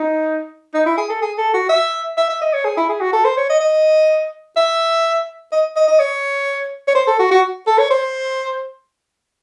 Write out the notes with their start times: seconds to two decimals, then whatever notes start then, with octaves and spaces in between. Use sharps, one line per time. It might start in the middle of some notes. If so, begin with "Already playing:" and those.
Already playing: D#4
0.74 D#4
0.86 E4
0.97 G#4
1.09 A4
1.22 G#4
1.38 A4
1.54 F#4
1.69 E5
2.17 E5
2.29 E5
2.41 D#5
2.53 C#5
2.65 G#4
2.77 E4
2.89 G#4
3.01 F#4
3.13 A4
3.25 C5
3.37 C#5
3.49 D#5
3.60 D#5
4.57 E5
5.52 D#5
5.76 D#5
5.88 D#5
5.99 C#5
6.88 C#5
6.95 C5
7.07 A4
7.19 F#4
7.31 F#4
7.67 A4
7.78 C#5
7.91 C5